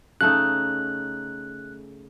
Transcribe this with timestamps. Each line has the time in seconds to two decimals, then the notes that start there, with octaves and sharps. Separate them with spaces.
0.21 C#3 A3 D#4 F#6